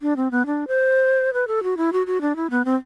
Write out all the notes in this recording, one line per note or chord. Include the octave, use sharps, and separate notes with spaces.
D4
C4
B3
D4
C5
B4
A4
F#4
E4
F#4
F#4
D4
E4
B3
C4